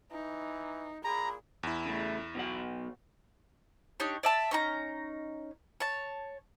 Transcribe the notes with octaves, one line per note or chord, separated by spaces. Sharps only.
E3 D#4
A#2 G#4 A#5 B5
E2 E4
C#3 A3
B2 F#3 F#5
D4 D#4 G4 C#5
D5 E5 A5
C#4 D#4 A#5
C#5 A5